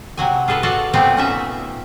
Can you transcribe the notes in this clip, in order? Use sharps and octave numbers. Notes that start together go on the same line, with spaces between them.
C3 F#3 G#5
F4 G#4 A4 B4
F#4 A4 D5 F5 A5
A#2 A3 B3 C4 D5
C#4 D#4 E5